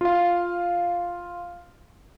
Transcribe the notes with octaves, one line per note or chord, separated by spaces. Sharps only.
F4 F5